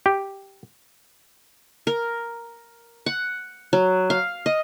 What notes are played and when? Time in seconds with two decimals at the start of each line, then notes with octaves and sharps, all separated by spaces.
0.06 G4
1.87 A#4
3.06 F#5
3.73 F#3
4.10 F5
4.46 D#5